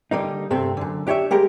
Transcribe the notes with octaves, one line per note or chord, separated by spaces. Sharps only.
D3 G3 A#3 D#4
G2 C3 A3 C4
F#2 D3
D4 G4 C#5 D5 E5
G3 G#3 G4 A#4